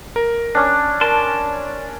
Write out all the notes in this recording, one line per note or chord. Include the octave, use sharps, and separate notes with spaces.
A#4
C#4 D4
A#4 D5 A5 C6